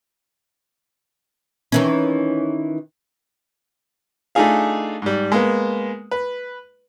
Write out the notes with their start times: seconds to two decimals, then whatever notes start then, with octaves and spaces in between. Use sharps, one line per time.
1.72 D#3 E3 C#4
4.35 A3 D4 D#4 F4 G#4 F5
5.02 G#2 G3
5.32 G#3 A#3 B3
6.11 B4